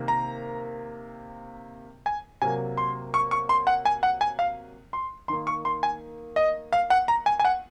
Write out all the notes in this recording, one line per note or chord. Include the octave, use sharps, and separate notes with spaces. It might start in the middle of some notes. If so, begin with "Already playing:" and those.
Already playing: C3 D#3 A#3
A#5
G#5
C3 F#3 A#3 G#5
C6
C#6
C#6
C6
F#5
G#5
F#5
G#5
F5
C6
D#3 A#3 C6
C#6
C6
G#5
D#5
F5
F#5
A#5
G#5
G#5
F#5